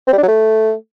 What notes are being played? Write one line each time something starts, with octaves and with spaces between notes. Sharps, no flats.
C4
G3
D4
F#3
A3